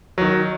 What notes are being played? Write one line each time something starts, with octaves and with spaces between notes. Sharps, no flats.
D#3 F#3